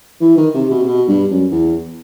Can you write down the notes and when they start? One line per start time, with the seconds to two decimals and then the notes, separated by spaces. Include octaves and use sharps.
0.21 E3
0.37 D#3
0.54 C3
0.71 B2
0.82 C3
0.87 B2
1.08 G2
1.30 F#2
1.51 E2